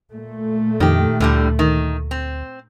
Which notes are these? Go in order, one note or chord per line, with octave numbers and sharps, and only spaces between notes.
A#2 A3
F2 D#3 G4
D2 A2 D3 G3
D#3
C4